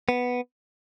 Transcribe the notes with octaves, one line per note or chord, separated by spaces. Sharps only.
B3